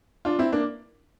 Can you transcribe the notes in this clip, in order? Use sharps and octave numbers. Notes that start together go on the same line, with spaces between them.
D4 F4
C4 E4
A#3 D4